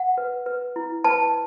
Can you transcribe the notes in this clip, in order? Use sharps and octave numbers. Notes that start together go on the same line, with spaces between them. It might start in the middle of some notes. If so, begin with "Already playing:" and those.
Already playing: F#5
B4
B4
E4
B4 A5